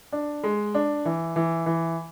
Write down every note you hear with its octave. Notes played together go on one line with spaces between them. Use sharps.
D4
G#3
D4
E3
E3
E3